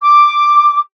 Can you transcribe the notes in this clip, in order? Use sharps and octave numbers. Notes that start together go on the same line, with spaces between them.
D6